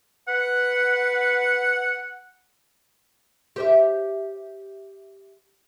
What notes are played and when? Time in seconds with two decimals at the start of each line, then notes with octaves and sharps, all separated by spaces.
0.28 B4 F#5
3.56 G4 C5 E5